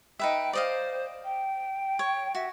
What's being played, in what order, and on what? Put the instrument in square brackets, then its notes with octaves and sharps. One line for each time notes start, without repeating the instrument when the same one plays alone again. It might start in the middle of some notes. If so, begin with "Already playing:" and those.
[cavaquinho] D#4 B4 E5 [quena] G5
[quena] C5 [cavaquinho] D5 D#5 F5
[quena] G5
[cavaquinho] C#5
[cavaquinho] F#4 [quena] E5